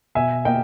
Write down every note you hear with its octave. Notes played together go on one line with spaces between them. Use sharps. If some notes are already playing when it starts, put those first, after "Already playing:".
B2 E5 G#5
A#3 D#5 G5